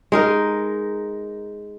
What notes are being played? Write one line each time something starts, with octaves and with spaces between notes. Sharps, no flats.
G#3 D#4 A#4